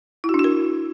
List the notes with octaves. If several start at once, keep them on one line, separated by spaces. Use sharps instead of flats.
E4
F#4
D4
F#4
A#4